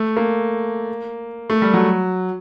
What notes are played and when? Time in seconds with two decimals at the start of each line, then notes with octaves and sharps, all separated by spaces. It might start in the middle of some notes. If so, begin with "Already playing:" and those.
Already playing: A3
0.17 A#3
1.50 A3
1.62 G3
1.74 F#3